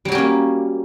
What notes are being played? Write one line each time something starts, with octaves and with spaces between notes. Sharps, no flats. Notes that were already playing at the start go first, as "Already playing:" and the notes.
F#3 G3 A#3 C#4 G4